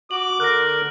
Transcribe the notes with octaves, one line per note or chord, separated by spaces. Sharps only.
F#4 D6 F#7
D3 A#4 F#6 A#6